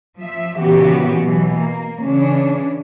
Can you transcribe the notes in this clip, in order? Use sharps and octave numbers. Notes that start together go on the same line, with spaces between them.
F3 E5
A#2 C#3 E3 B3 F#4 G4
B2 E3 F#3
A#3
C#3 E3 C#4 D4